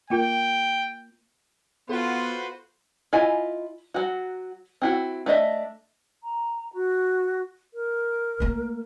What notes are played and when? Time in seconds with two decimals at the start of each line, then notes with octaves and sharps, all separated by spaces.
0.10 A#3 F4 A#4 G5
1.89 B3 F4 F#4 A4 B4 C5 F#5
3.13 E4 F4 D#5 G#5
3.94 F#3 F#4
4.82 C4 E4 F#4
5.26 A3 D4 D#5 E5
6.23 A#5
6.73 F#4
7.74 A#4
8.40 A3 A#3